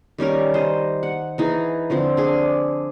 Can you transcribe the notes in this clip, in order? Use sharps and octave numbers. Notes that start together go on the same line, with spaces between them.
D#3 G3 C#4 A#4
C5 D#5
F#5
E3 D#4 G#4
D3 F3 C4
D4 G#4